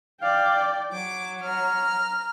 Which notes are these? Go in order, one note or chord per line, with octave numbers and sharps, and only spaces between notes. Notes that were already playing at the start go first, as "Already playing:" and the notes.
D5 F5 G5
F#3 C#5 D6
A#5 F6